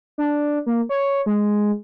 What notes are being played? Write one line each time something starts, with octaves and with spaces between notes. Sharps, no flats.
D4
A#3
C#5
G#3